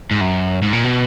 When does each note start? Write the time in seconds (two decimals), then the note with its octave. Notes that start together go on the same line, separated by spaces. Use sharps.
0.11 G#2
0.21 F#2
0.62 G#2
0.73 A#2
0.84 B2